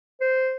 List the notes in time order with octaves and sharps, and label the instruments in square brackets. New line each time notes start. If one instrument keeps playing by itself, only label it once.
[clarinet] C5